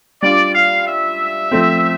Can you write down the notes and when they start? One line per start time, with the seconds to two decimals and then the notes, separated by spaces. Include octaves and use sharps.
0.22 G3 D4 F4 D5
0.55 F5
0.86 E5
1.51 F3 A3 C4